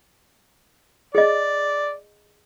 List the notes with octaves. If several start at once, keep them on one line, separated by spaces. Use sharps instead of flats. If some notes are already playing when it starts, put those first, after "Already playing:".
G#4 D5 D#5